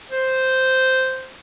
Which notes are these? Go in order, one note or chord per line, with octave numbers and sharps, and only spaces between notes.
C5